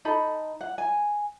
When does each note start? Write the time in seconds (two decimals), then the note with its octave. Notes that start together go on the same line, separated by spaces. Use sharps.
0.05 D#4 A4 B5
0.61 F#5
0.78 G#5